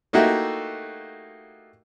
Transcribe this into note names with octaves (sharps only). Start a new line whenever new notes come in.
A3 A#3 D#4 E4 F#4 G4